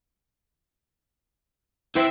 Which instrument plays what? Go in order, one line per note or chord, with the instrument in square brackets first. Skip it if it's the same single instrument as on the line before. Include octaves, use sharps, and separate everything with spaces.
[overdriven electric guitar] E3 [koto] C4 E5